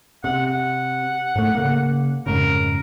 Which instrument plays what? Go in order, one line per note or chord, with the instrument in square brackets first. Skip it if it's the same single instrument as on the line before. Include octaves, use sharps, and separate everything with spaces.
[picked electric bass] C3 [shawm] F#5
[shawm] F#5
[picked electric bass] G#2 A3
C#3 A#3
[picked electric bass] F2 G#2 C#3 [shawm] A#4